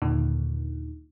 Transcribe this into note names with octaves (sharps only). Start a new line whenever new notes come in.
D#2 A#2 D3 D#3